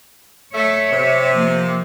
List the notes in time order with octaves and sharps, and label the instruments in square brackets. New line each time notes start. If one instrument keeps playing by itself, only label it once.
[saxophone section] A3 [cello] C#5 E5
[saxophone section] C3
[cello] F3 A#3